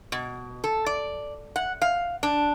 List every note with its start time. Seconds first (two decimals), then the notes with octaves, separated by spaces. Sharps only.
0.12 B2
0.64 A4
0.86 D5
1.56 F#5
1.82 F5
2.23 D4